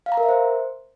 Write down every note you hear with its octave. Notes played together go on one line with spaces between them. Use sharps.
F5
A#5
A#4
E5
C5